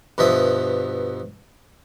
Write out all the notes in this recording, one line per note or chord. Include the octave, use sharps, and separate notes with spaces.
G2 B2 F3 E5 D#6